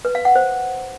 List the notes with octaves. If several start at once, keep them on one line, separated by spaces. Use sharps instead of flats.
B4
F5
F#5
C5